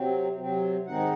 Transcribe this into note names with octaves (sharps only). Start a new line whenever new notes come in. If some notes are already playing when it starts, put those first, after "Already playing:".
Already playing: C3 F#3 C4
C3 F#3 C4
G#2 D#3 G#3 C4 D#4 F#5